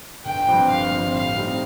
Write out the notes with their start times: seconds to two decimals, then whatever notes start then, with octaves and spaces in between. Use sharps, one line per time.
0.25 G1 G5
0.47 G2 F3 C4
0.70 G1 F5
0.92 G2 F3 C4
1.14 A2 F5
1.36 G3 C4 D#4